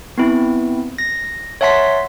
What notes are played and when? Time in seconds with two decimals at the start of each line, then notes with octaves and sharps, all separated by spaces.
0.18 B3 C4 E4
0.98 A#6
1.61 C#5 E5 F#5 A5 C6 B6